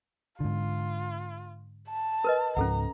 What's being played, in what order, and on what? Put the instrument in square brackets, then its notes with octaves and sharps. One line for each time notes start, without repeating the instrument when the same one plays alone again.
[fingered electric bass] G#2 D3 [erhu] F4
[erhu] A5
[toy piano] A#4 B4 D#5
[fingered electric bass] C#2 G#2 F3 [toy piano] C#4 A4 F#5 [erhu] A#5